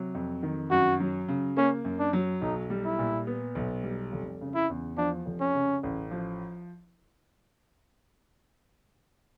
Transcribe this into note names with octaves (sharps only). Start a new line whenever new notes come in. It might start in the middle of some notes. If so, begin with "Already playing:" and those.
Already playing: C3 F#3
F2
D#3
F#2 F#4
F#3
C#3
A#3 C#4
F#2
D4
F#3
B1 D#4
G3
E4
A#2
B3
B1
G3
F1
C#3
E4
E2
F3 D4
F1
C#4
C#3
A1
F3